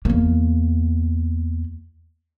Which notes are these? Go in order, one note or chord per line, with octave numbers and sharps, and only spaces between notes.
E2 A#3